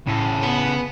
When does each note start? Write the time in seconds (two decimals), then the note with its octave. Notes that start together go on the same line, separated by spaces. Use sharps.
0.07 A2 C#3 A4
0.43 B3